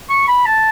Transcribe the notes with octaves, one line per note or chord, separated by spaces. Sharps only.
C#6
B5
A5